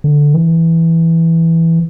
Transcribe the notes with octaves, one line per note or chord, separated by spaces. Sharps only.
D3
E3